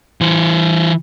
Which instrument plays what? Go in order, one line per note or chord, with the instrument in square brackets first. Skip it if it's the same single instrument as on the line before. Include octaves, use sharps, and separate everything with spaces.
[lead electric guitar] E3 C5